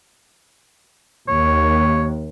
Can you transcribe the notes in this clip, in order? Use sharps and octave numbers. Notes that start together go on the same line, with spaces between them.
D#2 C#5